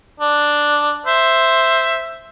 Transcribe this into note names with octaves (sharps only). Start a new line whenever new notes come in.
D4
C5 E5